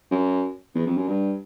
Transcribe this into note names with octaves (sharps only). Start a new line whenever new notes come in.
F#2
E2
F2
F#2
G2